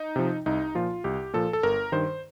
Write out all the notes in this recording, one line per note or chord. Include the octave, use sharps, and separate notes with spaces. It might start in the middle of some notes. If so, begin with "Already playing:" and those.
Already playing: D#4
C3 F3
C2 D#4
A#2 F3 F4
C2 G4
A#2 F3 A4
A4
G1 A#4
G2 D#3 C5